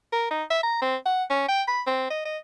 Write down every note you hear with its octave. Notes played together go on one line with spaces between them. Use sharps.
A#4
D#4
E5
A#5
C4
F#5
C#4
G5
B5
C4
D#5
D#5